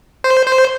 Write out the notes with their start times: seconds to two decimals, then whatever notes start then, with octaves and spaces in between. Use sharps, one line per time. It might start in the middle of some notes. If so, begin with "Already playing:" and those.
0.24 C5
0.46 C5